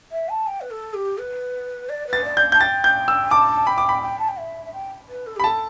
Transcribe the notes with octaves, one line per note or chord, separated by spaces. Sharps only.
E5
A5
G5
B4
A4
G4
B4
D5
B4
A6
D5
G6
A5 G6
G5 A6
G6
E6
A5 D6
G5 B5
D6
B5
G5
A5
G5
E5
E5
G5
B4
A4
G4 B5
A4 A5